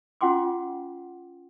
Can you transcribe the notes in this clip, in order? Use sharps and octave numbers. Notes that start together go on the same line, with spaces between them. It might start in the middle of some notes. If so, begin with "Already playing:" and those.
C#4 F4 F#5 G5 C6 D6